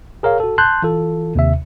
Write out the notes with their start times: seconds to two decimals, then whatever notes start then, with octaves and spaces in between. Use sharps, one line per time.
0.23 G#4 A#4 C#5 F5
0.40 F#4 A4
0.58 A5 C6 F#6 G6
0.82 E3 F4 A4
1.35 D#2 C3 E5